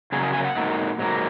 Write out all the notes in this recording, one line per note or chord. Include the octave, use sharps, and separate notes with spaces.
F#2 C#3 F#3 A#3 G#4
G#4
G#5
F#5
G#2 F#3 A#3
G#2 F#3 A#3